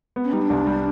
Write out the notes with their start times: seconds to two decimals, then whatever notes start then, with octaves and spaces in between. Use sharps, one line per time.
0.16 B3
0.24 C#4
0.32 G3 D#4
0.42 D4
0.50 C2
0.67 G3